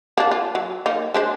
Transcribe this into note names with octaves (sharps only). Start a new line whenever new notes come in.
A#3 D4
F4
F#3
A#3 D#4
G#3 D4 C5